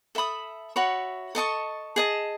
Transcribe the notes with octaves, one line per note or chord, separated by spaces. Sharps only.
A4 E5 B5 D#6
F#4 C#5 E5 B5
A4 D#5 A5 C#6
G#4 D#5 A5